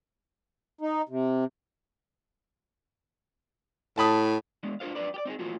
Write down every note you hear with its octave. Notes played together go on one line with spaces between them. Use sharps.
D#4
C3
A2 A5 B5 D#6
G#3 B3 D4
D4 F4 A4 C5 F5
F2 A#2 D4 B4 D5
G4 D5
C4 D#4 G4 G#4
A#2 E3 F3 A3 F4 F#4